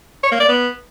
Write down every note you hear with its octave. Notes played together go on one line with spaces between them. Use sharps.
C#5
A#3
D5
B3